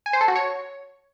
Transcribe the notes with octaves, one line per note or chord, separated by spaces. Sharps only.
G#5
C5
A4
F#4
C#5